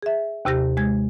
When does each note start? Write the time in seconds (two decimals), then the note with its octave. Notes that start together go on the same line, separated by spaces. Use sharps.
0.02 G#4 E5
0.45 D#2 C3 G4 A#6
0.77 G#3 G#6